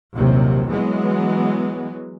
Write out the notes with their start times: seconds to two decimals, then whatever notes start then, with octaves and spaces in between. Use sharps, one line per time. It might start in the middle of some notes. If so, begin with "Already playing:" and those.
0.15 A#1 D#2 C3 F#3
0.69 E3 F#3 G#3 B3